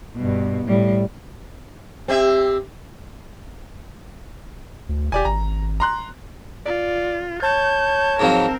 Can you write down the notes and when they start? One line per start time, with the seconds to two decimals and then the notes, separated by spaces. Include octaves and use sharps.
0.16 G2 B2
0.66 A2 G3
2.08 C4 G4 E5
4.89 D2
5.12 E1 G4 D5 G#5
5.25 G#1 A#5
5.80 A#5 C6 F#6
6.66 F4 D5
7.43 C#5 A5 G6
8.20 G#2 F3 F#3 C4 A#4